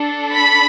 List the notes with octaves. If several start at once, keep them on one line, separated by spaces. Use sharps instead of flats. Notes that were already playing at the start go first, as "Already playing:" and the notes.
Already playing: D4 A4
B5 B6